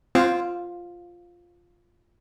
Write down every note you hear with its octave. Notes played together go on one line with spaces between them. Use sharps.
C4 F4